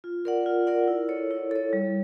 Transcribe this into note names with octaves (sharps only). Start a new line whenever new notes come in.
F4
A#4 D5 F#5
F4
A#4 D5 F#5
E4
A4 C#5
E4
A4 C#5
G3